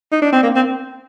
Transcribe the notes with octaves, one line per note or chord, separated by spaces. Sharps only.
D#4
D4
C4
A#3
C4